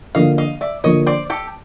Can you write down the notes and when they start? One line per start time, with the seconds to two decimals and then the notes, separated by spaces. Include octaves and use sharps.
0.15 D3 F3 A#3 D#5 F5
0.38 D#5 F5
0.61 D5 E5
0.84 D3 F3 A#3 C#5 D#5
1.06 C5 D5
1.30 G4 A4